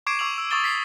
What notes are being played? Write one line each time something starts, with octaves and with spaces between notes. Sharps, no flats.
C#6 D6 G#6 C7 D7 E7
C#6 D6 E6 F7 F#7
E6
C#6 D#6 E6 A6 E7 G7
B6 C7